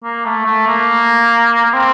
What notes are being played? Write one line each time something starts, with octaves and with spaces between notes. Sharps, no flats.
A#3
A3
A3
A#3
A#3
C4